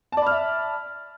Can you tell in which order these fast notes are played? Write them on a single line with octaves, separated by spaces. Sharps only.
A5 D5 B5 F6 E5